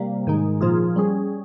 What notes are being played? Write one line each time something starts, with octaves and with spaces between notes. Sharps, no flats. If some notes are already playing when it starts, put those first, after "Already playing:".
Already playing: C3 G3 A#3
G#2 D#3 G#3 D#4
A#2 F3 A#3 F4 G#4
G3 C#4 G#4